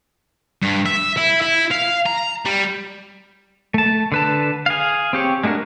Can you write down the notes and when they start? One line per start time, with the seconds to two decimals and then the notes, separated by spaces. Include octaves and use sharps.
0.62 G2
0.86 E5
1.17 E4
1.41 E4
1.71 F5
2.06 A#5
2.45 G3
3.74 A3 A5
4.12 D3 B4 A5
4.66 G#4 F5
5.13 C4 G4 C#5
5.44 G#3 A3 D4 F#4 A#4